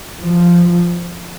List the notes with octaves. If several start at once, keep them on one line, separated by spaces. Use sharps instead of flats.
F3